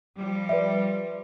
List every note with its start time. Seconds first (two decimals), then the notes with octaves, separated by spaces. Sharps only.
0.17 F3 G3
0.49 B4 D5 E5